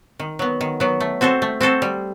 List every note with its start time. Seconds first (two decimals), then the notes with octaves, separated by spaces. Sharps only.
0.19 D#3
0.39 F#3 B3
0.61 D#3
0.80 F#3 B3
1.00 A3
1.21 C4 F#4 A4 C5
1.42 A3
1.61 C4 F#4 A4 C5
1.82 G3